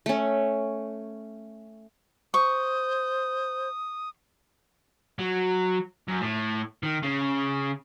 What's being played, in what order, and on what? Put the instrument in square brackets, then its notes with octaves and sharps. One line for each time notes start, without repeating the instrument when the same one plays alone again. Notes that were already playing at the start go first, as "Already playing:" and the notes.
[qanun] A3 C#4
[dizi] C5 [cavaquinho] C#6 [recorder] D#6
[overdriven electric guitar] F#3
F#2
A2
D#3
C#3